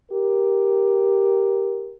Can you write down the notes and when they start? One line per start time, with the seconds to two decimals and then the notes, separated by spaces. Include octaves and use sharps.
0.11 G4 A#4